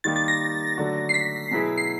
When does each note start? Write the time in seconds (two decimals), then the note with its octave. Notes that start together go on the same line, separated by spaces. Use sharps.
0.04 D#3 G3 A#3 D#4 G4 A6
0.16 A6
0.28 A#6
0.78 D3 F#3 A3 D4 F#4
1.09 C7
1.14 B6
1.51 B2 F#3 B3 E4 G#4
1.78 C7